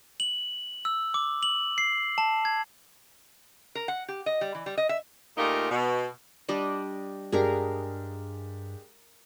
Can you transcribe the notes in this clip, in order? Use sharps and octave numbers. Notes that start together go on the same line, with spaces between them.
F#7
E6
D6
F#7
C7
A5
G#6
A#4
F#5
G4
D#5
G3
E3
G3
D#5
E5
A#2 A3 D#4 F4 G4 A#4
B2
G3 D4 D#5
G2 G#3 D4 G4 G#4 A#4 F5